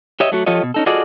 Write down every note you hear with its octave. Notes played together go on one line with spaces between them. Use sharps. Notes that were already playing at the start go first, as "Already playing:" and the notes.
G4 C#5 D#5 E5
F#3 A3 F#4
F3 F4 G4 A4 C#5 D#5
B2
C#4 D#4 A4
F4 F#4 G#4 A4 D5 D#5